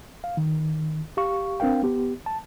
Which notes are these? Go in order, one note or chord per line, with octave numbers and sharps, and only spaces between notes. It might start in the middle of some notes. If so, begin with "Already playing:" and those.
F5
D#3
G4 F5 C#6
C4 D4 A#4 F5 G5
B3 G4
A5